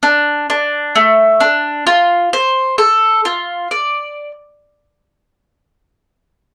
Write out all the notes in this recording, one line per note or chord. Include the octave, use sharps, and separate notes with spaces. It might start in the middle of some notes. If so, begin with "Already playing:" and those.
D4
D4
A3
D4
F4
C5
A4
F4
D5